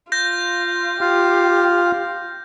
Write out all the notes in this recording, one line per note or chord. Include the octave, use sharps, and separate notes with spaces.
F4 G6 A#6
F4 G4 F5